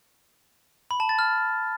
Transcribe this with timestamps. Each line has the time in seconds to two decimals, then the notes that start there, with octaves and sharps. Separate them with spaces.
0.91 B5
1.00 A5
1.09 A6
1.19 F6